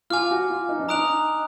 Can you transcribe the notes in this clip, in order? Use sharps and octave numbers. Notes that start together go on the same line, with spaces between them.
F4 G#5 D6 F6
F#4
F4
D#4
D4
D#4 A#5 D#6 F#6 D7 F7